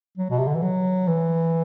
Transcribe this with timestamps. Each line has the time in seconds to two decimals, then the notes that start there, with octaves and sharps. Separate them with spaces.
0.17 F#3
0.30 B2
0.38 C3
0.47 D3
0.55 E3
0.62 F#3
1.08 E3